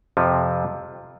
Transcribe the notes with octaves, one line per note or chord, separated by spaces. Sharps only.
F2 C3 F3